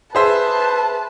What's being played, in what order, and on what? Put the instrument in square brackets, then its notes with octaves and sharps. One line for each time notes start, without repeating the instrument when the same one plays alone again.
[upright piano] G#4 C5 E5 [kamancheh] B4 A5